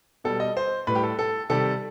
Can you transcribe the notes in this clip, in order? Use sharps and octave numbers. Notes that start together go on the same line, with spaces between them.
B2 G3 A4
D#5
C5
A2 G3 B4
G4
A4
A4
C3 D#3 G3 A4